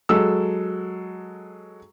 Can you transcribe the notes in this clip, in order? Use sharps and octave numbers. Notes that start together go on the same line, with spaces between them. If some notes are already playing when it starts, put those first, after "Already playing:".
F#3 G#3 A4 E6